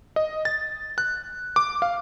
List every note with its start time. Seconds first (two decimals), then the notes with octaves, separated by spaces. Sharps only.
0.16 D#5
0.45 A6
0.98 F#6
1.56 D6
1.82 F5